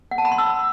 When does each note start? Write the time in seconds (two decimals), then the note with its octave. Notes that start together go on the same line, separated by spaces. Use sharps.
0.11 F#5
0.18 A5
0.25 B5
0.32 C6
0.38 E6